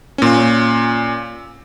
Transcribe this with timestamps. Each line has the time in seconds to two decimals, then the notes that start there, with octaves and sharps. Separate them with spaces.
0.18 A#2 C#4